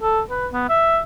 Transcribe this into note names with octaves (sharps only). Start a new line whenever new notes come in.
A4
B4
B3
E5